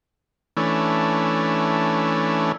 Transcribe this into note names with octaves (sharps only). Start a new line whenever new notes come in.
E3 A3 C#4 D4